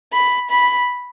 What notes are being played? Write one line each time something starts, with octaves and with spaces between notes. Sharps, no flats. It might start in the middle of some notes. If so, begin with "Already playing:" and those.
B5
B5